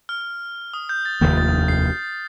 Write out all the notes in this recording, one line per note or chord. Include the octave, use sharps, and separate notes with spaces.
F6
D#6
G6
A6
F1 D#2 D#3 A#3 G6
A6
C7